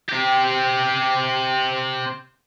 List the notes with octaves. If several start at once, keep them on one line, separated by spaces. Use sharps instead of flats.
C4 G4